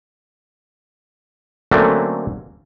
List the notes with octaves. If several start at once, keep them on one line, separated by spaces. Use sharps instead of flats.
D3 F#3 A3 A#3 C4 C#4